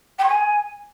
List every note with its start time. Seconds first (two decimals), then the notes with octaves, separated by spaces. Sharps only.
0.18 G5
0.23 C#6
0.28 G#5